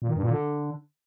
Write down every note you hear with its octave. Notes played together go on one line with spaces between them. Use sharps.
A#2
D#3
G2
A#2
D3